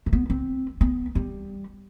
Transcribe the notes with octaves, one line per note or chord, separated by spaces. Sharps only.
A3
B3
C4
B3
G3